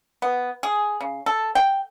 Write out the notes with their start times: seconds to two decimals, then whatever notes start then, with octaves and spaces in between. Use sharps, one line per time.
0.22 B3
0.63 G#4
1.01 C#3
1.26 A4
1.55 G5